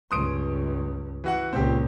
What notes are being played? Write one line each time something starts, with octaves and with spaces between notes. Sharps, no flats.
C#2 G2 C6 D#6 D7
E3 F#4 F#5
C#2 A#2 C4 G4